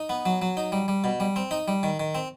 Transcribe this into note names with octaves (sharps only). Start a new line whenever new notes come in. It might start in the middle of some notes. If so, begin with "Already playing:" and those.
Already playing: D#4
B3
F#3
F#3
D#4
G3
G3
B2
G3
C4
D#4
G3
D#3
D#3
C4